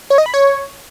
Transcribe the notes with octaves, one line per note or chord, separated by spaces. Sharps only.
C#5
D#5
B5
C#5